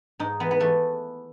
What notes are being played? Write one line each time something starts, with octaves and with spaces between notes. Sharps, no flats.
G#2 D#4
E3 B3
B3
E3 A3